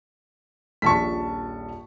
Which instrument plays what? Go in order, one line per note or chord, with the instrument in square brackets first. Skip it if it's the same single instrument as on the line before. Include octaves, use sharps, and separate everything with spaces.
[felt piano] D#1 A#1 A5 [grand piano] C#6 B6